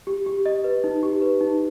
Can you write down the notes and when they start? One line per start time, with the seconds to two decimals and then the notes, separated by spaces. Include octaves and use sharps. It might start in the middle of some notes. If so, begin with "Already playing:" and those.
0.07 G4
0.26 G4
0.46 D#5
0.64 B4
0.84 D#4
1.03 G4
1.22 B4
1.41 D#4